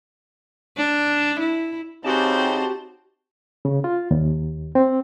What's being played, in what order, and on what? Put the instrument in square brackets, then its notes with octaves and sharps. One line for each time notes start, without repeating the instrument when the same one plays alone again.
[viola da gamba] D4
E4
[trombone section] C#3 [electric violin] C4 C5 [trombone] D#4 [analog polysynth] F#4 G4 A5
[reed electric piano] C#3
F4
D#2
C4